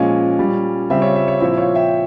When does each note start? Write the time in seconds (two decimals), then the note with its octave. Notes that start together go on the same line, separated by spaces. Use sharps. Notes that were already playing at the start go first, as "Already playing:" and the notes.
Already playing: A#2 F3 G#3 C#4
0.38 A#2 G3 C#4
0.89 C#3 G3 C4 F4 E5
1.02 C#5
1.15 E5
1.28 C#5
1.40 A#2 F3 C4 E4 E5
1.57 C#5 F5
1.75 E5 G5